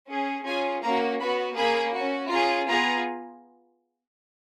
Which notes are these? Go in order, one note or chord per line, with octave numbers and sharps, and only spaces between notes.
C#4 G#4
C#4 F4 G#4 G#5
A#3 C#4 F#4 A#5
B3 F#4 B5
A#3 C#4 G#4 B5
C#4 F#4
C#4 F4 G#4 A#5
B3 F4 G#4 A#5